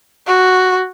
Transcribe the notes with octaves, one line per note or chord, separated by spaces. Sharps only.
F#4